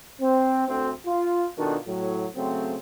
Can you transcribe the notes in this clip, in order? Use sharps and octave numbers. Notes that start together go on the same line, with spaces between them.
C4
D2 C4
F4
B2 D#3 D4 F4 F#4 A4
A2 F#3
C#3 F#3 A3 C4